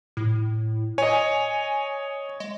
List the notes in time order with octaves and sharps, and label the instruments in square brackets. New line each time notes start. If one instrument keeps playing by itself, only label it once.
[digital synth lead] A2
[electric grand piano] C#5 D#5 [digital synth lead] G#5
[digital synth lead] G#3